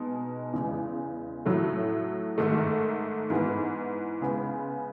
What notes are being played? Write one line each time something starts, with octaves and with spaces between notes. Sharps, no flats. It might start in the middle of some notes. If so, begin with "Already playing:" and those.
Already playing: B2 G#3 D#4
E2 C#3 G#3
A2 F#3 A3
G#2 D#3 A3
G#2 E3 B3
C#3 G#3 B3